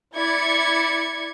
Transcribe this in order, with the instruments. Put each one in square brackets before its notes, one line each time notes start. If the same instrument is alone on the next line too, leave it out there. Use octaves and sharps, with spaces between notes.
[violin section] E4 D5 G#6 C#7